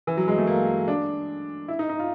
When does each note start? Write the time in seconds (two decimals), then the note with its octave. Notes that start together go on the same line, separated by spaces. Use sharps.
0.07 E3
0.17 F#3
0.28 G#3
0.38 A3
0.47 A#3
0.88 D4
1.68 E4
1.79 D#4
1.89 D#4
1.99 F4